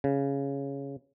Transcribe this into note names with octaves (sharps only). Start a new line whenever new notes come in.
C#3